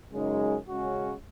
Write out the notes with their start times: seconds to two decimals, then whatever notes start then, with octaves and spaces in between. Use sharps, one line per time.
0.11 F#2 C#3 G#3 D#4 G#4
0.68 C#3 G#3 C#4 F#4